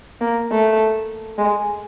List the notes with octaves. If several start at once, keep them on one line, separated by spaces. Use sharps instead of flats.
A#3
A3
G#3